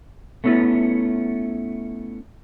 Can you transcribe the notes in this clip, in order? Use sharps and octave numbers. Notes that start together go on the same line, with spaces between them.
A3 B3 C#4 E4 F4